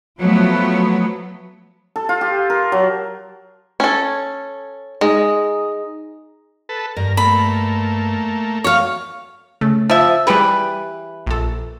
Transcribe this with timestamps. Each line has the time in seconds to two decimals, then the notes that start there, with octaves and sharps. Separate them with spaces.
0.18 F3 F#3 A3 B3
1.96 A4
2.09 F4
2.21 G4
2.50 A#4
2.72 F#3
3.80 C#4 A4
5.01 G#3 D#4 G#4 D#5
6.69 A4 B4
6.96 G2 A#4
7.17 A3 A#3 B5
8.64 F#3 A3 F#4 C#5 F5
9.61 C#3 A3
9.90 F3 E5
10.27 E3 G3 G4 G#4 B4
11.27 A#1 A4